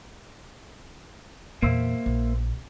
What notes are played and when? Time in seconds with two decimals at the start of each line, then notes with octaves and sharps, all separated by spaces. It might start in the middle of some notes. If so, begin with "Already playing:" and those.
1.62 E2 A#2 A#3 C5 E5
2.06 A#1